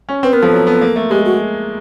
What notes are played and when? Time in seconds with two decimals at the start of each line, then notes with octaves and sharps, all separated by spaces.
0.09 C#4
0.23 C4 B4
0.33 B3 A#4
0.42 F3 A4
0.52 F#3
0.67 B3
0.81 A#3
0.96 A3
1.10 G#3 G4
1.25 F#4